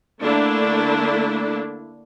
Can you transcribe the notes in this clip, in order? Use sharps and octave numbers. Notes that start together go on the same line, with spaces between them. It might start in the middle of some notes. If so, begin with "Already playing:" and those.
D3 A3 A#3 D4 E4